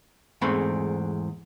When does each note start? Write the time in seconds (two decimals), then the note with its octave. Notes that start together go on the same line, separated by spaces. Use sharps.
0.41 E2 G#2 A3 C4 B5